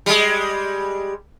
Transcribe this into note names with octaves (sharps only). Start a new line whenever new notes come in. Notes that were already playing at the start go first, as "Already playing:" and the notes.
G3 G#3